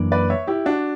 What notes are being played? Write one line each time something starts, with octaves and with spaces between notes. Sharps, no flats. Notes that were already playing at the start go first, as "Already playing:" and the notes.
Already playing: F#2 E3 A#3 D4
B4 D5
C#5 E5
E4 G4
D4 F#4